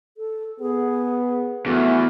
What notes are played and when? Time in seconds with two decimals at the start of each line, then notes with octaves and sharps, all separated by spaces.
0.17 A4
0.60 B3 G#4
1.66 E2 A3 F#4